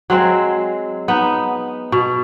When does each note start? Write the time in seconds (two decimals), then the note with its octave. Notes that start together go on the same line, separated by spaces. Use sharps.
0.10 F#3 G#3 C4
1.08 B3 D#4
1.92 B2